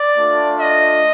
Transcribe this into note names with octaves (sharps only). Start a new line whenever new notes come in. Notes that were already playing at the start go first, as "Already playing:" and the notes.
Already playing: D5
A3 D4 F4
D#5